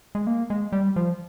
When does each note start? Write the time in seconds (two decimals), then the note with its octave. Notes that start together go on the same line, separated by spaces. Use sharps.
0.15 G#3
0.27 A#3
0.50 G#3
0.72 G3
0.96 F3